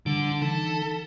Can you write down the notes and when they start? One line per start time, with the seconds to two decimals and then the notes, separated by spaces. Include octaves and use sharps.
0.06 D3 G3 D4
0.42 E3 D#4 A4